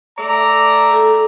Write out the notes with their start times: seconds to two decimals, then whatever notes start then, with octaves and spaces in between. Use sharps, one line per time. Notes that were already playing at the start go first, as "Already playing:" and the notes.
0.19 A3 D5 A#5
0.91 A4